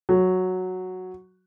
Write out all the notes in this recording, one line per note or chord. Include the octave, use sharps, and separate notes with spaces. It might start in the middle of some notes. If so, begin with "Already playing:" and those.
F#3